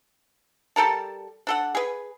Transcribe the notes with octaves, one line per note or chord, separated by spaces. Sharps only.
G3 A4 A#4 A5
D4 A4 F#5
G#4 B4